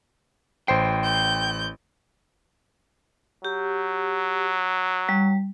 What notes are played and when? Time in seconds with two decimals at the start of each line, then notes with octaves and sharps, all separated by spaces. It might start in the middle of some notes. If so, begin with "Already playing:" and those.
0.68 A1 C5 G5 C7
1.04 G6
3.45 F#3 G4
5.09 G3